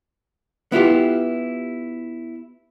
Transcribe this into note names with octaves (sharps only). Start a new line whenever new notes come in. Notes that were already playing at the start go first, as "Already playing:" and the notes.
B3 E4 F4 G4